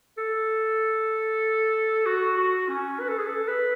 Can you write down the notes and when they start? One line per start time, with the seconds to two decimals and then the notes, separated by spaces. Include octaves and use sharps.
0.18 A4
2.06 F#4
2.37 F#4
2.69 C#4
3.00 B4
3.08 A4
3.18 G#4
3.27 A4
3.48 B4